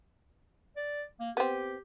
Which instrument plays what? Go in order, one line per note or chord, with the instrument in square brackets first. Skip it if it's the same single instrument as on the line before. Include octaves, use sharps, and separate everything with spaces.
[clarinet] D5
A#3
[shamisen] B3 C4 [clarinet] G4